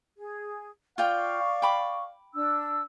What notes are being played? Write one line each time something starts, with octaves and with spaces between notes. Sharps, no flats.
G#4
F4 D5 F5 G5 C#6
G5 B5 D6
D4 E6